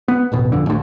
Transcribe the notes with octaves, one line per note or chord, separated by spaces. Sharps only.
B3
D1 A1 B2
F#1 F2 D3
A1 D2